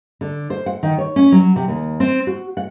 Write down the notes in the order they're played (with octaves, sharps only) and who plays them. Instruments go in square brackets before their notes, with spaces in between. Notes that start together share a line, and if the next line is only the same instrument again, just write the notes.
[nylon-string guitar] D3
C5
F#5
D#3
C#5
C#4
F#3
C3
D#2
C4
F#4
F#5